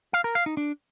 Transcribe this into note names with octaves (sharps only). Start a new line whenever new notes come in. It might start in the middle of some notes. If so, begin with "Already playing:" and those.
F5
A#4
F5
D#4
D4